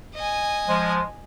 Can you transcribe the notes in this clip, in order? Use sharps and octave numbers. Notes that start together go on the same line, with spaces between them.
D#5 G#5
F3 G#3